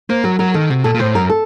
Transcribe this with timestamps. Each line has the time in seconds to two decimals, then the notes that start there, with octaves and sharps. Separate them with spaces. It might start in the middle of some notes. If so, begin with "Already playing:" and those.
0.09 A#3 C5
0.24 F#3 A#4
0.39 F#3 A#4
0.54 D#3 A4
0.70 C3 F#4
0.84 A#2 A4
0.94 A#2
0.99 A2 C5
1.15 F#2 A#4
1.30 A4